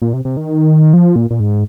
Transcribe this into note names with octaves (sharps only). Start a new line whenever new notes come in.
A#2
C3
C3
D#3
F3
A#2
A#2
G#2